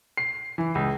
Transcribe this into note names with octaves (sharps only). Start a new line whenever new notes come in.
C7
E3
C#2